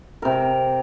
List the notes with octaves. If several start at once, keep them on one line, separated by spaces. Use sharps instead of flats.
C3 A#4